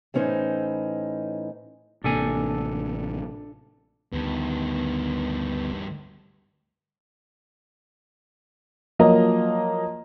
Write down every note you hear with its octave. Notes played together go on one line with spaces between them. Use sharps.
A2 E3 C#4 D#4 C5
A1 C3 A#3 D4 A4 G#5
D2 G2 D#3 B3
F3 F#3 A#3 D#5 A#5